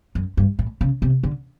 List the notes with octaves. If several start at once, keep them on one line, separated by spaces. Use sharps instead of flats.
F#2
G2
A2
C#3
C3
D3